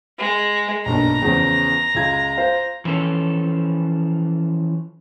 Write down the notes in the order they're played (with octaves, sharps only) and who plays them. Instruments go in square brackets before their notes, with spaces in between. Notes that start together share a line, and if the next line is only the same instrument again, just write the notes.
[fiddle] G#3
[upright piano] B1 G2 A#2 [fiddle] A#5
[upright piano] E2 C#3 F3
C#2 F4 G#6
F4 C5 F5
[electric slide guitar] E3 F3 C#4 A4